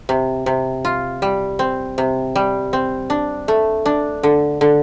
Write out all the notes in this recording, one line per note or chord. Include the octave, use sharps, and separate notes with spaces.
C3
C3
F4
G3
C4
C3
G3
C4
D4
A3
D4
D3
D3